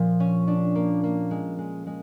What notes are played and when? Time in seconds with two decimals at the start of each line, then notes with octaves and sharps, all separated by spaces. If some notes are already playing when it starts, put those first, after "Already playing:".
Already playing: A#2 F3
0.20 C#4
0.47 D4
0.75 A#3
1.04 A#3
1.31 G#3
1.58 G#3
1.87 G#3